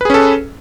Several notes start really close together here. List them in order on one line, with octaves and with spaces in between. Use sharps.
B4 G#4 C#4 A4